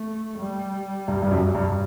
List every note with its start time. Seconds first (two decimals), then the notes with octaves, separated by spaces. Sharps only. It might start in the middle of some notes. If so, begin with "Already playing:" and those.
Already playing: A3
0.39 G3
1.08 G2
1.23 G2
1.31 F#2
1.55 G2